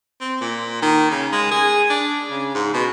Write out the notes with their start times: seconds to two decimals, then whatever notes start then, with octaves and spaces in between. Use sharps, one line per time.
0.21 C4
0.41 A#2
0.82 D#3
1.11 C#3
1.32 G#3
1.51 G#4
1.90 D4
2.30 C#3
2.55 G#2
2.74 B2